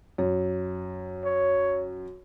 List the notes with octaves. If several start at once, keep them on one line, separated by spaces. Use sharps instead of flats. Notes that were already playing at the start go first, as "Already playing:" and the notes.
F#2
C#5